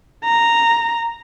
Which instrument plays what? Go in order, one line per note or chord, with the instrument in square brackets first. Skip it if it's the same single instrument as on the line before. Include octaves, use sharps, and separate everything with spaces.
[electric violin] A#5